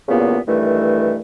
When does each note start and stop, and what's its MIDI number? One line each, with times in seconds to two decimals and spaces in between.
0.08 0.37 40
0.08 0.37 43
0.08 0.37 46
0.08 0.37 49
0.08 0.37 58
0.08 0.37 59
0.47 1.20 43
0.47 1.20 51
0.47 1.20 52
0.47 1.20 57